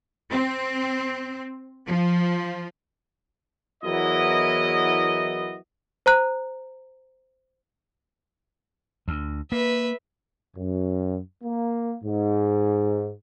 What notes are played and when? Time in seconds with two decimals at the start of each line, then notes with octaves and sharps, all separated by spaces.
0.32 C4
1.87 F3
3.84 E2 F#3 B3 E4 A#4 D#5
6.06 C5 A#5 F#6
9.08 D2
9.52 A#3 B4 E5
10.57 F#2
11.43 A#3
12.04 G#2